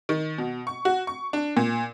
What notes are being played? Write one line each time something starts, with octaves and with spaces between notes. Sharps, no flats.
D#3
B2
C#6
F#4
C#6
D4
A#2